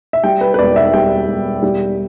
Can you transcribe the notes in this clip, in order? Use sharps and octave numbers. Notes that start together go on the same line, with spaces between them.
E5
G3 G5
B4
B4
E1 D5
E5
G3 G5
E1
G3